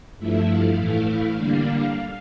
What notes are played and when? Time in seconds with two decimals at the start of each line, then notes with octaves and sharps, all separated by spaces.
0.18 G2 F3 A3 E4 E5
0.48 F5
0.77 A2 E3 A3 E4 F5
1.36 D3 G3 A#3 D4